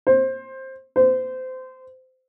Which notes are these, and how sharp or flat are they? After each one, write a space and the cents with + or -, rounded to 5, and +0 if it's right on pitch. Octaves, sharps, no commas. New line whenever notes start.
C5 +15
C5 -25